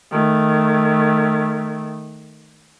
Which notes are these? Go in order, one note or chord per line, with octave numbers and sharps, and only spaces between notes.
D#3 A3